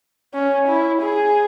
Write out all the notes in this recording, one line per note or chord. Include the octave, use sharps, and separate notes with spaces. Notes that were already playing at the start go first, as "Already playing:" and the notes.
C#4
E4
G#4